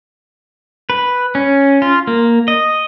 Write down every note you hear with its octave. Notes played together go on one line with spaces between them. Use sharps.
B4
C#4
F4
A#3
D#5